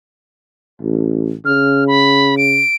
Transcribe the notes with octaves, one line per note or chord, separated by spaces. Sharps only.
A1
C#3 F6
B5
D7